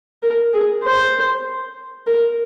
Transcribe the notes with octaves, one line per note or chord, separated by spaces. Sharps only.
A#4
G#4
C5
A#4